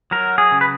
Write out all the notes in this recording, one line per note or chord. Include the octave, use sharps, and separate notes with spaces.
F#3 A#4
G#4
C#3
B4